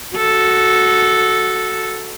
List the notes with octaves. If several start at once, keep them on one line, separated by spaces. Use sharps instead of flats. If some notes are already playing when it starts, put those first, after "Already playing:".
F#4 A4